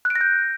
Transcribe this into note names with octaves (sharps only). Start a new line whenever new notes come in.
F#6
D7
A#6
G6